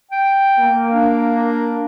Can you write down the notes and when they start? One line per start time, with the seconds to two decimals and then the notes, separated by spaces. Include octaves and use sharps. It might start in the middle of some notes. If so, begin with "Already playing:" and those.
0.11 G5
0.59 A#3
0.94 D4